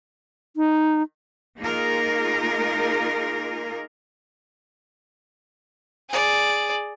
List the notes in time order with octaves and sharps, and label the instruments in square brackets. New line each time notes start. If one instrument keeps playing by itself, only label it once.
[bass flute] D#4
[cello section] A#3 D#4 F4 G#4 A#4
[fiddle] G#4 D5